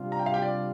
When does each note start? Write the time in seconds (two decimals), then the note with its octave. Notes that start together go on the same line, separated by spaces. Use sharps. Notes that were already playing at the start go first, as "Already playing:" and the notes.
Already playing: C3 G3 D4 F4
0.12 A#5
0.19 G5
0.26 F5
0.34 G4 G5
0.42 D5